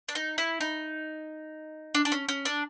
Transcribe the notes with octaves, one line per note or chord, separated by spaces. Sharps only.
D4
D#4
E4
D#4
D4
D4
C#4
C#4
D4